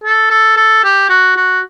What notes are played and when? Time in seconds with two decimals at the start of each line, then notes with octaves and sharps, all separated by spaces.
0.04 A4
0.30 A4
0.57 A4
0.84 G4
1.09 F#4
1.37 F#4